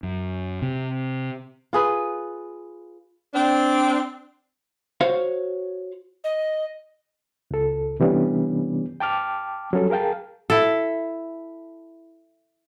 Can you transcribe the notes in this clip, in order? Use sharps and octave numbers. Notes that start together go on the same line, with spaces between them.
F#2
C3
F4 G#4 B4
C4 D4
F#4 C5 C#5 F5
D#5
C#2 A4
C3 E3 G3 B3 C#4 D4
G5 A5 D6 F6
F#3 G3 C#4 A4
G#4 A#4 F5 G5 A5
E4 A4